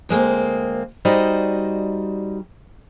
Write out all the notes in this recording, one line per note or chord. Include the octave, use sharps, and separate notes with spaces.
D2 G#3 A#3 C4
G3 D#4 F#4 C5 D5 D#5